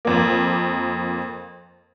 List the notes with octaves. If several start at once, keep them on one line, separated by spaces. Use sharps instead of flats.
F2 A#3